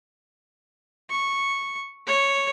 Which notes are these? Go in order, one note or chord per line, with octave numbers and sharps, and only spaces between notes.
C#6
C#5